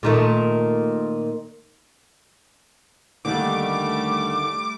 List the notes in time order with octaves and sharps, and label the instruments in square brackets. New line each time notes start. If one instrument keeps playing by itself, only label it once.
[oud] A#2 D#3 A3
[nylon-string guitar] D#2 D3 D#3 [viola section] G3 A3 [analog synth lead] D6